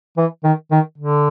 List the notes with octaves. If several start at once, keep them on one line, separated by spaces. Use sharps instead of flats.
E3
D#3
D#3
D3